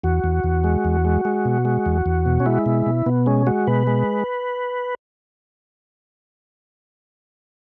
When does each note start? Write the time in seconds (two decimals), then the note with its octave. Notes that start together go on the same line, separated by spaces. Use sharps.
0.04 E2 F#4
0.24 E2
0.44 E2
0.64 G#3
0.85 E2
1.05 G#3
1.25 G#3
1.45 B2
1.65 G#3
1.86 E2
2.06 E2
2.26 B2
2.40 C#4
2.46 G#3 E4
2.66 B2
2.86 B2
3.06 B2 B3
3.26 G#3 C#4
3.47 G#3 F#4
3.67 B2 B4
3.87 G#3